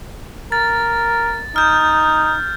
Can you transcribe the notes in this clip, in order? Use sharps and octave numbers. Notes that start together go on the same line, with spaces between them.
A#4 A6
D#4 F6 G6